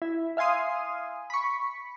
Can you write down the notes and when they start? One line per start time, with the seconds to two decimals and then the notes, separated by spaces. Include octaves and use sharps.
0.02 E4
0.37 E5 F5 G#5 C6 D#6
1.30 B5 C#6